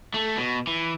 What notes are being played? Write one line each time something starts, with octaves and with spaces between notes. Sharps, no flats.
A3
B2
E3